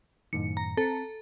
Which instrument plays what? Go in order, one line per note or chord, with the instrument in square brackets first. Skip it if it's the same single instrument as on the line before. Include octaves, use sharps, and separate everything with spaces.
[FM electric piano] F#2 A2 D#3 [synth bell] C#7
[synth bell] A#5
[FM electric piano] C4 [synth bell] A4